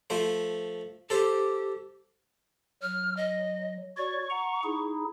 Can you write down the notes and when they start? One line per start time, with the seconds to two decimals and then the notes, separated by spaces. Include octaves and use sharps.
0.10 F3 A3 C5
1.10 G4 A4 C5
2.82 F#3 F6
3.17 D#5
3.97 F#4 C#5 D5 C#6
4.30 F#5 A#5
4.64 D#4 E4 G#4